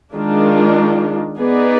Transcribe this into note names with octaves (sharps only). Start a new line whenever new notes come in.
D#3 G#3 D4 F4
B3 D#4 G#4 B4 D5